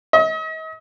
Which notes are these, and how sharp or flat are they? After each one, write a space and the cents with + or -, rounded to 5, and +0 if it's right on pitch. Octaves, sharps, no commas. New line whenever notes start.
D#5 +40